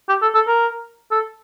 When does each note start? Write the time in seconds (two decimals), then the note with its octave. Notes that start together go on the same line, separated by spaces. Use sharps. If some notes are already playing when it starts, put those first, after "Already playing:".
0.09 G4
0.22 A4
0.35 A4
0.48 A#4
1.11 A4